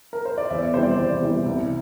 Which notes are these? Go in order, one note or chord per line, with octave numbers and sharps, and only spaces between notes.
A#4
C5
D5
E2 E5
C3 E3 G3 C5
D5
C5
E2
C3 E3 G3
C2